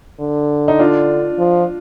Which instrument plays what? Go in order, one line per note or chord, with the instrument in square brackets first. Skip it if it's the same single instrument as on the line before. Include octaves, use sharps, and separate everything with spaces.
[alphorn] D3
[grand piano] D#4
D4 F4
[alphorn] F3